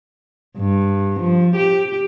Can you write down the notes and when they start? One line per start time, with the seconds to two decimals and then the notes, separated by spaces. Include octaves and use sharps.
0.58 G2
1.20 F3
1.56 G4